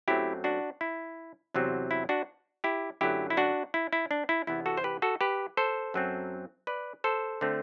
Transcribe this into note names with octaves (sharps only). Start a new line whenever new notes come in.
F#2 F#3 A3 C4 E4 G4
D4 F#4
E4
E2 C3 F#3 C4
E4
D4 F#4
E4 G4
F#2 D3 F#3 A3 E4 G4
E4
D4 F#4
E4
E4
D4
E4
E2 C3 E3 B3 E4
F#4 A4
C5
G4 B4
F#4 A4
G4 B4
A4 C5
F#2 F#3 C4
B4 D5
A4 C5
D3 A3 C4